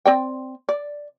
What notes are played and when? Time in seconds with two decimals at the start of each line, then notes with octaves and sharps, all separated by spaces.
0.06 C4 D5 G5
0.69 D5